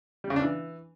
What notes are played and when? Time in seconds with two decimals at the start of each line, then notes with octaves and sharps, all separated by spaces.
0.24 G3
0.30 C#3
0.36 D4
0.42 E3